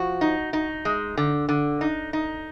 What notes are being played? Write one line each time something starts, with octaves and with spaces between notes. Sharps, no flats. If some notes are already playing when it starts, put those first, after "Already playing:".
Already playing: F3 F#4
D#4
D#4
G#3
D3
D3
D#4
D#4